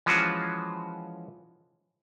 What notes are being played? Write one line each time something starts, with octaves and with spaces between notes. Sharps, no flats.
E3 F3 G#3 C#4 F4 F#4